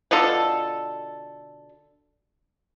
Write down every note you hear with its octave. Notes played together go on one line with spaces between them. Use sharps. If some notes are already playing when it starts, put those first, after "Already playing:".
B2 D3 F4 A4